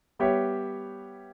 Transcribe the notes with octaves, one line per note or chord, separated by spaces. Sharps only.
G3 B3 G4 C#5 E5